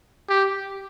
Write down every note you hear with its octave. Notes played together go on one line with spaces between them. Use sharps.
G4